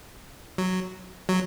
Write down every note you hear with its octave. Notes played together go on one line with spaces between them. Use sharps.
F#3
F#3